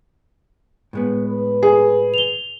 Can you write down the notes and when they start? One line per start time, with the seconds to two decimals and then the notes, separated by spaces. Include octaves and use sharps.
0.93 A2 G#3 B3
1.27 B4
1.63 G#4
2.14 F7 G7